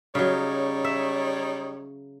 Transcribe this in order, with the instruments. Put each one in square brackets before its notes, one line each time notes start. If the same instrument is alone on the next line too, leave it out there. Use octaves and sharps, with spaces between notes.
[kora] C#3 F#3 [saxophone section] G3 D#4 C#5
[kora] E5